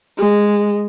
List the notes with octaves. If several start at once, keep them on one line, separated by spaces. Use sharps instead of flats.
G#3